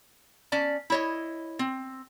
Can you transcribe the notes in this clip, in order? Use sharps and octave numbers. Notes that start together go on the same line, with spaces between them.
C#4 D5 A5
E4 C#5 D#5
C4